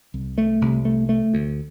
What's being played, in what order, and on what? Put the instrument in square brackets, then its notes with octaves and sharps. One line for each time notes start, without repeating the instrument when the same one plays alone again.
[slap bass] C2
A3
C2
A3
A3
D2